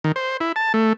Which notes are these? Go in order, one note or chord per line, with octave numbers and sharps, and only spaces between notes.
D#3
C5
E4
A5
A3